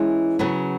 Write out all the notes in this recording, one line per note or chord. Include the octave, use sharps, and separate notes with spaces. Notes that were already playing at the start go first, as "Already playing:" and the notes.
Already playing: E3 G#3 C#4
C#3 F#3 B3